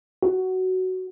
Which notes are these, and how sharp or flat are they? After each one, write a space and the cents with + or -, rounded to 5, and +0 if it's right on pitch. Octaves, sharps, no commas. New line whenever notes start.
F#4 +10